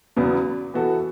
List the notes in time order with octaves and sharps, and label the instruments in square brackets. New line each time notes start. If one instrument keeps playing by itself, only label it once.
[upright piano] E2 C#3 F#3 B3
E3 B3 F#4 A4